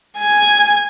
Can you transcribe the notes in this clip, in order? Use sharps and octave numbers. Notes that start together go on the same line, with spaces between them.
G#5